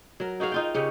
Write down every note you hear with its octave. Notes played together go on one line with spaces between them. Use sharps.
F#3 A#4
D#4 F#4 G#4 F5
D#4 F4 G5
C#3 C#4 G4